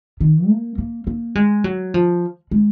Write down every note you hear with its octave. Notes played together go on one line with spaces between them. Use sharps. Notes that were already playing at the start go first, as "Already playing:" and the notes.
D#3
A#3
A#3
A#3
G#3
F#3
F3
G#3